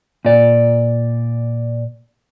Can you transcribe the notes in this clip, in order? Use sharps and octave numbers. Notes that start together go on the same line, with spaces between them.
A#2 D5